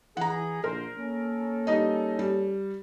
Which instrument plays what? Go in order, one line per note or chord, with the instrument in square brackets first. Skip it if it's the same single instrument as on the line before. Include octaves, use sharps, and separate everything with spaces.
[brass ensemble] E3 G#4 [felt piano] F#5 A#5
[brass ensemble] A#1 D3 C5 [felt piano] A#4
[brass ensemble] A#3 C#4 A4
[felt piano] G3 D#4 D#5
G3